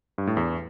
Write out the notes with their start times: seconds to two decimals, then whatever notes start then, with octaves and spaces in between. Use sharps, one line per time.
0.18 G2
0.27 A2
0.37 E2